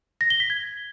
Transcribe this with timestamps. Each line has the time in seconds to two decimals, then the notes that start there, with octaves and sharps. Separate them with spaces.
0.21 A#6
0.30 G7
0.40 B6
0.50 G#6